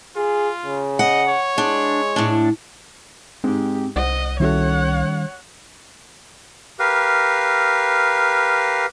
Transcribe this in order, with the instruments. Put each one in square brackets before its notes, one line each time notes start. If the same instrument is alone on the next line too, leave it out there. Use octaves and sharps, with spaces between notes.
[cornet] F4 [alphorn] G#4
[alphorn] C#3
[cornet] D#5 [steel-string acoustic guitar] F#5
[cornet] C#5
[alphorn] G#3 [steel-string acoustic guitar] D4
[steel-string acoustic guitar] A2 D4
[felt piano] G#2 G#3 [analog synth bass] C4 [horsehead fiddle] G4
[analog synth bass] C2 [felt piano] C5 F#5 [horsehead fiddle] D#5
[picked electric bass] D#3 G3 C#4 [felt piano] E4 F#4 A4 [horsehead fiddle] C#5 F#5
[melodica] G4 A#4 B4 F5